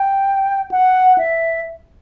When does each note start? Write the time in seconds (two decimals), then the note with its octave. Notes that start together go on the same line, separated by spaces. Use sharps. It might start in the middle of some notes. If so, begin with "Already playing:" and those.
Already playing: G5
0.71 F#5
1.18 E5